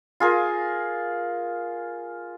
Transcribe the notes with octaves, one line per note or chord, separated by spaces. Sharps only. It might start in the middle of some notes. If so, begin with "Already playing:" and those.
F4 G#4 A#4